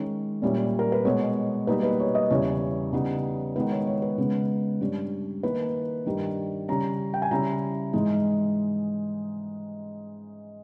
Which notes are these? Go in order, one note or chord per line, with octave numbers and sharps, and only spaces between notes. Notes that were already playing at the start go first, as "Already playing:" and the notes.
Already playing: D#3 G#3 C#4
A#2 G3 C#4 E4
A#4
B4
B2 G#3 B3 C#5
B2 G3 A#3 D#4 B4
B4
C#5
D#5
E2 C#3 E3 G3 C#5
C#3 G3 B3 D#4
D#3 G#3 B3 D#4 B4
C#5
C#5
B4
C#3 G#3 B3
G2 G3 C#4
D#3 A#3 E4 B4
G2 D#3 G3
C#3 G3 C#4 A#5
G5
G#5
C#3 G3 C#4 E4 A#5
G#2 E3 G#3 D#4